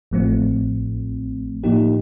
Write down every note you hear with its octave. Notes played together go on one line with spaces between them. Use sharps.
A1 A2 F3 A3 C4
A2 F3 A#3 D#4 G4